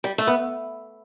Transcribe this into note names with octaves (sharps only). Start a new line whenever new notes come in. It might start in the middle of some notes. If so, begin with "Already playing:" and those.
G3
A3
B3